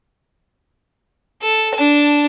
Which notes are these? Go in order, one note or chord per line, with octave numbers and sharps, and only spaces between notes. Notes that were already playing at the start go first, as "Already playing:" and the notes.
A4
D4 A5